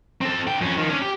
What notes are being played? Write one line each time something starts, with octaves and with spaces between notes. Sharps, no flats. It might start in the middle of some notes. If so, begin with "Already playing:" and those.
C4 A4
D3 G5
F2 C#4
D#3 F3
C#4 D4
G4